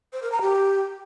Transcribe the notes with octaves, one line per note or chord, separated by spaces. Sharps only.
C5
A#4
A#5
G4